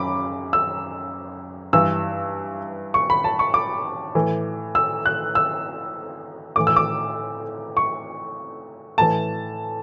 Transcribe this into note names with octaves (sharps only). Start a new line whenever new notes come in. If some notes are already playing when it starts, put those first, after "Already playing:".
Already playing: F#2 C#3 B5 D6
E6
G2 E3 E6
C#6
B5
A5
C#6
D6
A2 E3
E6
F#6
E6
A2 E3 D6
E6
D6
C#6
A2 E3 A5